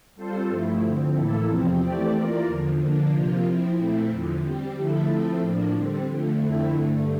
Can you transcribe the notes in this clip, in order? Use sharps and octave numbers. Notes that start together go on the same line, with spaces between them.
G3 C4 F4 A4 C5
G2 F3 A3 E4
D3 F3 C4
A2 E3 A#3 E4 A4
E2 C3 F3 C4
E3 A3 C4 G4 D5
E3 A#3 F4 A#4 D5
E2 D3 F3
D3 F3 A#3 D4
C3 F3 A#3 F4
F3 C4 E4
A#2 A3 C4 E4
E2 D3 F3
G3 C4 G4
D3 F3 A3 E4 A4
F3 A3 C4 E4 A4
A2 F3 A#3 D4
D3 G3 C4
D3 F3 A3
F2 D3 A3 C4 E4
G2 D3 A3